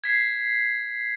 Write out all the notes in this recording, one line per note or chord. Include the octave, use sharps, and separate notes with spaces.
G#6 B6 C7